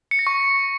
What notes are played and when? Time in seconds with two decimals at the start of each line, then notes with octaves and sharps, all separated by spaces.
0.11 C#7
0.19 A#6
0.27 C#6